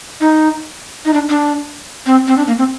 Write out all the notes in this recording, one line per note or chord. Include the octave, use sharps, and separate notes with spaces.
D#4
D#4
D4
D4
C4
C4
D4
A#3
C4